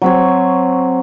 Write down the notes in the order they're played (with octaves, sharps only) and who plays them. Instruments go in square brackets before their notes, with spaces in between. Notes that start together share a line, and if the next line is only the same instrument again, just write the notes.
[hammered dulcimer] F#3 C4 C#5